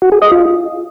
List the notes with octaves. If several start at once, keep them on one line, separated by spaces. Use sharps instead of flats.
F#4
G#4
D#5
F4